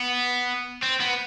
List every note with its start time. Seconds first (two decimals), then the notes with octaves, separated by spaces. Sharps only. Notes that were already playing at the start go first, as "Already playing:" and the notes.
Already playing: B3
0.83 C4
1.00 B3